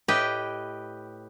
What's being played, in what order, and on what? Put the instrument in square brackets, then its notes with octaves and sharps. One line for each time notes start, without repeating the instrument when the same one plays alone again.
[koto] A2 G4 B4 D#5 G5